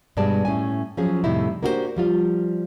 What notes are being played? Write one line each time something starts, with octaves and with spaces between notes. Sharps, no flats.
G2 B2 G3 G#3 D5 A5
A2 C#4 G#5
F3 F#3 C#4 G#4
F2 A2 C3 G3 D#4 E4
A#3 D4 F#4 G4 A4 C5
F3 G3 F4